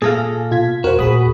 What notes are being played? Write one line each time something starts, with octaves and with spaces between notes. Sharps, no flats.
A#2 G#4 A4 F5 A#6
B2 F4 G#6 B6
E2 F#4 A#4 C5
D#2 A#2 G#4 B5 D#6